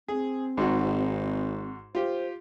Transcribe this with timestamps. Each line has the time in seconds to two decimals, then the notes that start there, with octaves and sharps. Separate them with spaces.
0.08 C4 G#4
0.57 G#1 G#2 F#4
1.95 F4 G4 C5